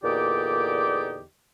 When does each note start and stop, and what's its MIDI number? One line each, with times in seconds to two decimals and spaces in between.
0.03 1.22 40
0.03 1.22 46
0.03 1.22 50
0.03 1.22 63
0.03 1.22 67
0.03 1.22 74